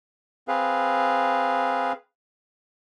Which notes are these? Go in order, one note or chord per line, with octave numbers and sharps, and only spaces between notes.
C4 G#4 B4 F5